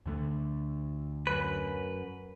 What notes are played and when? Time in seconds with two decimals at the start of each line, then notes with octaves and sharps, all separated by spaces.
0.06 D2 D3 A3
1.27 F#2 B4